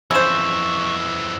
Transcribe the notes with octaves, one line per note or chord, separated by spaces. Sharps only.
F2 C#3 E3 C5 C#6 E6 E7